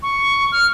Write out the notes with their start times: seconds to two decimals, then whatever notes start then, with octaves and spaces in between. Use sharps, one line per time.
0.03 C#6
0.52 F6